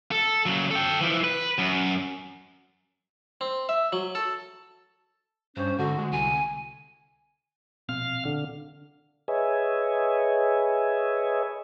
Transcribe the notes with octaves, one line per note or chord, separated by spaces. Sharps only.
A4
C#3 F#3
A4 G5
E3 F3
B4
F#2
C4
E5
F#3
A4
G2 C#4 C5
G#2 D3 F#4
D3 G#3
C2 G#5
A#1 B2 C4 F5 F6
D3
G#4 B4 C#5 D#5 E5 G#5